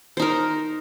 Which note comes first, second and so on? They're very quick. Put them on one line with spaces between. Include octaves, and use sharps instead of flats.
C5 D#4 A#4